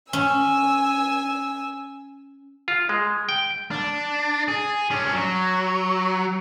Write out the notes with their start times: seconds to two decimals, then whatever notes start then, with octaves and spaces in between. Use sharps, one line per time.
0.13 C#4 G#5 E6
2.68 F4
2.89 G#3
3.29 G5
3.71 D4
4.48 G#4
4.91 C#4 D4
5.14 F#3